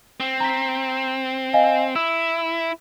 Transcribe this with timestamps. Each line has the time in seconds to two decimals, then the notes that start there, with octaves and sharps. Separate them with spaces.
0.20 C4
0.40 A#5 B6
1.53 D#5 F5 G#5
1.96 E4 E6